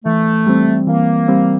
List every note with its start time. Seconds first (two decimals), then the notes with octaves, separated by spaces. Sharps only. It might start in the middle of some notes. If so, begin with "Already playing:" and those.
0.05 E3 A3
0.47 G3 C4
0.87 E3 A#3
1.28 G3 C4